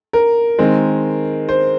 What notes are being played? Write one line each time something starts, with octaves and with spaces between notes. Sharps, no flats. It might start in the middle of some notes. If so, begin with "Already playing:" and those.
A#4
D#3 G#3 C4
C5